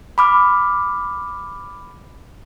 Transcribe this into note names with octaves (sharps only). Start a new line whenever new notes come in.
B5 D6 F6